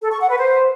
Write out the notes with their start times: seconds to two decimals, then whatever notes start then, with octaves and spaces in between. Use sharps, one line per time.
0.02 A4
0.11 C#6
0.20 F#5
0.29 B4
0.38 C5